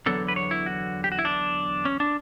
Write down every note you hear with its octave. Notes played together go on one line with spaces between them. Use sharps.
E2 D3 F#3 B3 A4
B4
C#5
E4
F#4
G4
F#4
E4
D4
C#4
D4